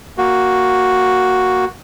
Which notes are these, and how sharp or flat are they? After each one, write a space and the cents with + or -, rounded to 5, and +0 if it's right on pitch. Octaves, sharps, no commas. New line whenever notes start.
A#3 +0 F#4 +0